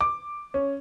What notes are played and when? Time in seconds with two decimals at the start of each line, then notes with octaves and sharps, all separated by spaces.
0.01 D6
0.54 C#4